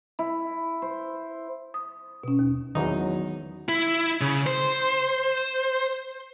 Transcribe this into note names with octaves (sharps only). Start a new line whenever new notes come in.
E4
C5
D#6
B2 C#4
D#2
G#1 E2 D#3 F#3 D#4
E4
C#3
C5